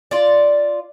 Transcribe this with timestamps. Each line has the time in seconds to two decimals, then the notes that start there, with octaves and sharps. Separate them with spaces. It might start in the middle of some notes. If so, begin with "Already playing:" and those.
0.11 F4 D5